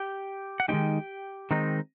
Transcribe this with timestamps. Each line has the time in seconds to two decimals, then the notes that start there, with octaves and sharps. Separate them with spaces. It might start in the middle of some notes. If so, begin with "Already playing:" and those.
Already playing: G4 G5
0.60 F#5
0.68 D#3 G#3 C4 D#4 G4 G5
1.51 D#3 G#3 C4 D#4